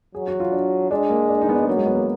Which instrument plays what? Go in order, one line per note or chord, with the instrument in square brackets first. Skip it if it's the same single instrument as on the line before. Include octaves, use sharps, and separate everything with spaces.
[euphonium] F#3 [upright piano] G#4
[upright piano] F#4
F4
D4
[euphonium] G#3 [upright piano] D4
[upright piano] A#3
D4
D#4
B3
D4
[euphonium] F#3 [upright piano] A#3
[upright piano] G#3
B3
A#3